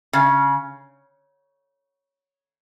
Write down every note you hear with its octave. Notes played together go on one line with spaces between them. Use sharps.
C#3